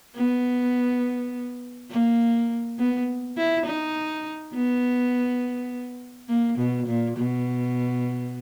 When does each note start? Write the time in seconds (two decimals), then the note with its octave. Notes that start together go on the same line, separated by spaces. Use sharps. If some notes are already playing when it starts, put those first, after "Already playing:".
0.16 B3
1.91 A#3
2.79 B3
3.37 E4
3.66 D#4
4.54 B3
6.29 A#3
6.58 B2
6.87 A#2
7.17 B2